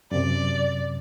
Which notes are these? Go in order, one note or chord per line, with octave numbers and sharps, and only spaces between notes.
F#2 C3 D5